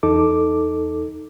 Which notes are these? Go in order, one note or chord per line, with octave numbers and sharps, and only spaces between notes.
E2 D#4 A4 D6